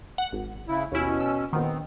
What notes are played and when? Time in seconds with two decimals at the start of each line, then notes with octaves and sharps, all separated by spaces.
0.18 F#5
0.32 G#1
0.68 C#3 E4
0.92 D#2 B2 C#4 E4
1.20 E6
1.53 A#1 D#3 B3 C4